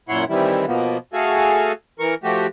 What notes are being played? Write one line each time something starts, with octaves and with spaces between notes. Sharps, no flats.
F#2 A#2 E4 C#5 F#5 C6
C3 D#3 E3 G3 E4
B2 F3 A#3 B3
A3 F#4 G#4 A4 F5 G#5
E3 A#4 C#6
F3 A3 F#4 G4